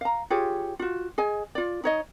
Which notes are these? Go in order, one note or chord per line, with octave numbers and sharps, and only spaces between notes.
F5 A#5
F4 G4 G#4 C#5
F4 F#4
G#4 D#5 G#5
F4 D5
D#4 C#5 D#5